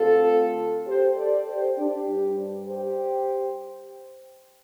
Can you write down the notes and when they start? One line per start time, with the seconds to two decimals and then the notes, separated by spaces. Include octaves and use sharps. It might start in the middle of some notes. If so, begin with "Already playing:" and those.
Already playing: D3 A3 C4 F4 A4
0.87 G4 C5
1.16 A4 D5
1.47 G4 C5
1.77 D4 G4
2.07 G2 G3 D4
2.67 G4 C5